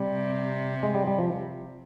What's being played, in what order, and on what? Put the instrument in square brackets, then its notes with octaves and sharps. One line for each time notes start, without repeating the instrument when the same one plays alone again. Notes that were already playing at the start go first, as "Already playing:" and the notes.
Already playing: [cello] C3 [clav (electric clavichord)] G3
[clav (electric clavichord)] G#3
G3
G3
F3